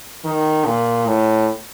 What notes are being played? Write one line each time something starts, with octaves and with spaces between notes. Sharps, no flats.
D#3
A#2
A2